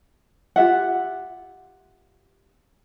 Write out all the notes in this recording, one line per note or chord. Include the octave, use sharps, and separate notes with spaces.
F4 G4 E5 F#5